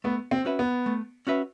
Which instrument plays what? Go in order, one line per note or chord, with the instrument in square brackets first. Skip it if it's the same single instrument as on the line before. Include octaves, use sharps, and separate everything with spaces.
[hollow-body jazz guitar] A3 [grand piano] B3
[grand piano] C4
[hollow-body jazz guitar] C#4 F#4 B4 E5
[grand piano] B3
[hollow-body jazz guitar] A3
C#4 F#4 B4 E5